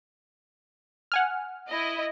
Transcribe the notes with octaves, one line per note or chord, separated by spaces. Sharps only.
F#5 G#5 F6
E4 D#5